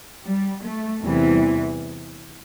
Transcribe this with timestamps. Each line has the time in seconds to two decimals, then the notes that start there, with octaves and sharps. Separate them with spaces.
0.25 G3
0.64 A3
1.02 E2 C3 E3 G3